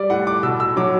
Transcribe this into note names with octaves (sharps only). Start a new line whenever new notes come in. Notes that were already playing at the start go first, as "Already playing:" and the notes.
Already playing: G3 D5
A2 F#5
D6
B2 E6
E6
F#3 D6